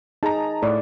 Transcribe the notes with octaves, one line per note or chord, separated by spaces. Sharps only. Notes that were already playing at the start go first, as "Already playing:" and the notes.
D#4 G#4 A5 A#5
A2 D5